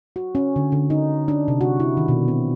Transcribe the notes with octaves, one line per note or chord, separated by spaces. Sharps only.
F#4
C#4
D3
D3
D#4
D4
C3
F#4
E4
D#3
B2
C4